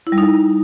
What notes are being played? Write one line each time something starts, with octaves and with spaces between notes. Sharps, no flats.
E4
G3
D#4